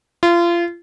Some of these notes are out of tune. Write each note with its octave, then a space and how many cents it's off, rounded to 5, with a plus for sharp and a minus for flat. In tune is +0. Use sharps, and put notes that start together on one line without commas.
F4 -30